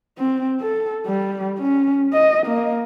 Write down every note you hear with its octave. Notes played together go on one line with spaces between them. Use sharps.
C4
A4
G3
C#4
D#5
A#3